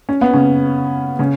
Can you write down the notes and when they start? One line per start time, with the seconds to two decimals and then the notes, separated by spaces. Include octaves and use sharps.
0.09 C#4
0.21 B3
0.33 C#3 C#4
1.19 C#3 C#4